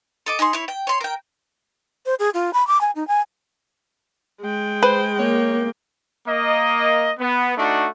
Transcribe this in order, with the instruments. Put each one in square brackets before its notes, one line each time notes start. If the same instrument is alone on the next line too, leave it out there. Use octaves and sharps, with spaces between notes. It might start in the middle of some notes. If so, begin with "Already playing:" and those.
[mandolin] A4 D#5 D6
D#4 G#4 A#5 C6
E4 C#5
G5
C#5 C6
A#4 G5
[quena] C5
G#4
F4
B5
D6
G#5
D#4
G#5
[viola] G#3 G5
[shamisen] B4 [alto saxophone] C5
[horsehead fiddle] A#3 [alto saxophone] C#5
[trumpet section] A#3 D#5
B3
A3 D4 D#4 F#4